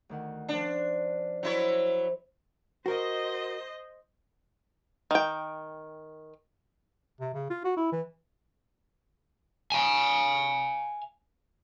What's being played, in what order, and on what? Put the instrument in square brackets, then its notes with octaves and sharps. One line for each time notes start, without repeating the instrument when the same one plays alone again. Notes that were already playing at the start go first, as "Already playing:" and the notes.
[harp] D2 D#3 F#5
[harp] F3 C#4 [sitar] D4
[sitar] F#3 E4 C#5 [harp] C5
[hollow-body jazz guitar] F#4 A#4 [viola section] C5 D#5
[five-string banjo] D#3 G5
[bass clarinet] C3
C#3
F4
F#4
E4
E3
[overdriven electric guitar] F5 G#5